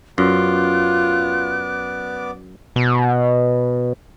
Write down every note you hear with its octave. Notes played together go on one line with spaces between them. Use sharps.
F#2 B3 F4 D5 D6 F#6
B2